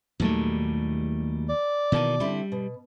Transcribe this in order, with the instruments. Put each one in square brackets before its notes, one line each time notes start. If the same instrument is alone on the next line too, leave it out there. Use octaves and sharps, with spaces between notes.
[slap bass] D#2 A#2 D#3 [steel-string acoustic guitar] F#3 G3 A3
[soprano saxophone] D5
[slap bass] B2 D#3 E3 [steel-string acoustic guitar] A#3 A5
[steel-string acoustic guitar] D3 C4 E4 [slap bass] G3
[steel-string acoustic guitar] B2